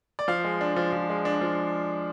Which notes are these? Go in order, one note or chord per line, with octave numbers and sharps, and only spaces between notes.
D5
F3 F5
G#3
D4
F3
F3
G#3
D4
F3